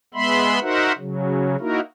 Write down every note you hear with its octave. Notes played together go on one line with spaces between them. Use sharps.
G#3 B3 E5 B5 C6
D#4 F#4 A#4 C5 E5 F#5
C#3 F#3
A#3 D#4 E4 F#4 A#4